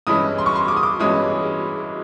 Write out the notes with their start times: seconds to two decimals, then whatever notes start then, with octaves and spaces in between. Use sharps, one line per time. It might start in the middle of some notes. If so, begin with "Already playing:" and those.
0.07 G2 E3 G#3 C#4 E4 D#6
0.38 C6
0.46 C#6
0.56 C6
0.68 D6
0.77 D#6
0.83 D6
0.99 G2 E3 G#3 C#4 E4 D#6